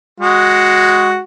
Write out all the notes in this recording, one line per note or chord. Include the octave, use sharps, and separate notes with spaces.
G#3 F#4